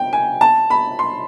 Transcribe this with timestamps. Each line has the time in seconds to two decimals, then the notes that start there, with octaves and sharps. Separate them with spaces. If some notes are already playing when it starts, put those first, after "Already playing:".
Already playing: G5
0.13 G#5
0.41 A5
0.70 B5
0.99 C6